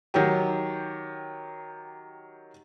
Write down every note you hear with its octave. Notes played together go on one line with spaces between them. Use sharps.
D#3 F#3 G4